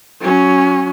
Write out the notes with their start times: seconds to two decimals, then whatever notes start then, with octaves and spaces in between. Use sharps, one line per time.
0.21 F#3 C#4